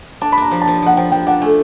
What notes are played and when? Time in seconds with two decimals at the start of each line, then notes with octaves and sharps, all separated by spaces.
0.21 D4 A5
0.32 B5
0.37 D4 A#5
0.51 F3
0.62 A5
0.67 F3
0.82 F3 F#5
0.97 F3 G5
1.12 F3 G5
1.26 D4 F#5
1.42 A3 G#5